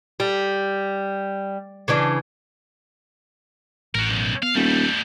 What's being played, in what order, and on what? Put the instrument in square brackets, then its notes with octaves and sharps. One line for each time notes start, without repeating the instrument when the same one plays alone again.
[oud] G3
C#3 E3 D4
[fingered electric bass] A1 [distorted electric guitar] F#4 A#4
[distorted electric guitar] B1 F#2
[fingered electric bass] B3 [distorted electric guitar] F5
[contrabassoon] D#1 [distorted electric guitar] G3 A3